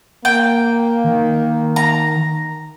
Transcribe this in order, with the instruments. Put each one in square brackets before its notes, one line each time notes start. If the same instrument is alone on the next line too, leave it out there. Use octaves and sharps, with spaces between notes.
[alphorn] A#3 [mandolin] G5
[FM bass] D#3
[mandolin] A#5